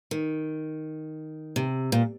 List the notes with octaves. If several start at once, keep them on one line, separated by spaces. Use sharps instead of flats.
D#3
C3
A#2